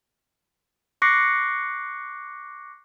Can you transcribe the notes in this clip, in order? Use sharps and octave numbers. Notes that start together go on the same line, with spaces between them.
C#6 D6 F#6 A#6 C7 C#7